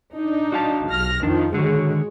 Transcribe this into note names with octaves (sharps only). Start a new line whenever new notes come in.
D4 D#4
F#4 F5 A5
B1 F6 A#6
F2 D#3 F3 D4
D3 D#3 G#3 F#4 C#5